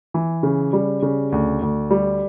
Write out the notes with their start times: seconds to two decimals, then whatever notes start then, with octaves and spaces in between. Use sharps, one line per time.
0.14 E3
0.43 C#3
0.73 G3
1.02 C#3
1.32 D2
1.62 D2
1.91 G3